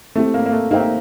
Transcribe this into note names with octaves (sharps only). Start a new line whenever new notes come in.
A3 C4 E4 G4
A#3
A#3
A3
A#3 D#4 G4 C5 E5 G5